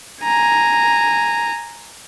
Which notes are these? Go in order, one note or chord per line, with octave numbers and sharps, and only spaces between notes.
G#5 A#5